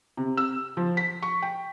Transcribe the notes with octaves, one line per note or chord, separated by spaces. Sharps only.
C3
E6
F3
B6
C#6
G5